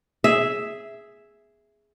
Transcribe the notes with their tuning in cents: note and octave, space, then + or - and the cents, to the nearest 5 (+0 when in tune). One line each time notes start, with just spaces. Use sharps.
G#4 +0 E5 +0